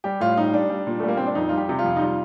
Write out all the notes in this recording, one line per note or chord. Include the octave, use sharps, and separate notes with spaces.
G3 G4
A2 F4
G3 D#4
G3 D4
G3
A#2
G3 A3
A#3
A#2 C4
D4
F2 D#4
G3 F4
G4
C3
F4
F2
D#4
G3 F4